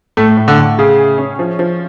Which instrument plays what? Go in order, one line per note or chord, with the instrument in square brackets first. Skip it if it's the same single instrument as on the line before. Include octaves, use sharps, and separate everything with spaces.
[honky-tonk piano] A2 [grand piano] A3
[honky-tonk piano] A2
[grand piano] D3
[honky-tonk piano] A2
[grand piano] C#3 [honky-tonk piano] G#4
[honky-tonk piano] G#4
C#4
F3
F3